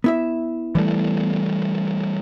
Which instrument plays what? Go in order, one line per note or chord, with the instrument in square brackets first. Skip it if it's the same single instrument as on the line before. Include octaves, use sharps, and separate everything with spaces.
[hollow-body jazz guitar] B3 E4 E5
[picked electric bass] E3 G3 A3